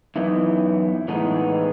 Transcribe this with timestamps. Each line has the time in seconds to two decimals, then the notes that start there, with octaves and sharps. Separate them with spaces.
0.16 F#2 E3 B3 D#4 E4
1.08 A2 E3 G#3 B3 D#4